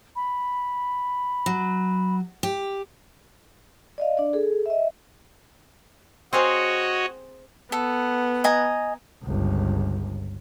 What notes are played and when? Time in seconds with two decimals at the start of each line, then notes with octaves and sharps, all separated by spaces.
0.16 B5
1.46 F#3
2.43 G4
3.98 D5 D#5 F5
4.17 D4 D5
4.33 G#4 A4
4.66 D#5 E5
6.33 C4 F#4 G#4 C#5 D#5 F5
7.72 B3 A4
8.44 D#5 G#5 A#5
9.23 G1 C#2